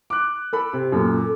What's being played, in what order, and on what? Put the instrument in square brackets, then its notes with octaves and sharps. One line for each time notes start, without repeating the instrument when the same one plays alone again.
[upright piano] D6 F#6
A4 B5
C3
[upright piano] F#2 A#2 [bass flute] A4